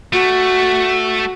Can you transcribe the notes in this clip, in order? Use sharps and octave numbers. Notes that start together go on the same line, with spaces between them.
A3 F#4